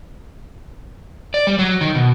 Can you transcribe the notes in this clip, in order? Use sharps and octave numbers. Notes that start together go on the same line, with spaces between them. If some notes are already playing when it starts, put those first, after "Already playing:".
D5
G3
F#3
D#3
B2